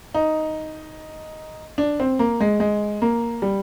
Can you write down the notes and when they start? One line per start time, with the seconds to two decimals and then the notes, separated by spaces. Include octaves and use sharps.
0.14 D#4
1.78 D4
2.00 C4
2.19 A#3
2.40 G#3
2.60 G#3
3.02 A#3
3.42 G3